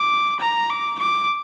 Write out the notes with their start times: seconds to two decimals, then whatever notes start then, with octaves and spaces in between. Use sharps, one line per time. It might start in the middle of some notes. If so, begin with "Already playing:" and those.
Already playing: D6
0.40 A#5
0.70 D6
0.99 D6